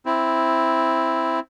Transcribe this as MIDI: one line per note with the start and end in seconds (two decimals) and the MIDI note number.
0.06 1.40 60
0.06 1.40 64